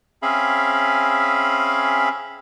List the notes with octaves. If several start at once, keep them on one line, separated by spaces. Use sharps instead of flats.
C4 C#4 G#4 E5 F5 B5